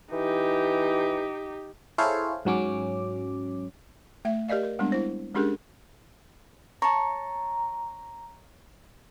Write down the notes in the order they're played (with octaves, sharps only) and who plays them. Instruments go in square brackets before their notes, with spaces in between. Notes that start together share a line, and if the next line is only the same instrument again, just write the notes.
[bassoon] E3 [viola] D#4 G4
[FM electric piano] E4 G#4 A4 C5 C#5 F5
G#2 F#3 C#4 D6
[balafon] A3 E5
G4 A#4 D5 D#5 F5
A#4
G3 G#3 B3 C4 D4
E4 C5
G#3 C#4 D4 G4 G#4 A#4
[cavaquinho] C#5 A5 [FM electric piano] A#5